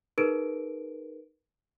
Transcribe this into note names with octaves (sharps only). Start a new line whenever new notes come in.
D#4 G#4 A#4 B4 D7